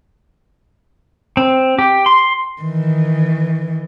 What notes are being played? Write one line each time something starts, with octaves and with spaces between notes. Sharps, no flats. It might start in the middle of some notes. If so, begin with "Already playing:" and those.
C4
G4
C6
D#3 E3